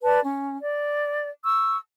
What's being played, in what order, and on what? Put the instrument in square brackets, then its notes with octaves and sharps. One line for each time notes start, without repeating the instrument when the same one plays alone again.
[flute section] B4 D5 A5
C#4
D5
C#6 E6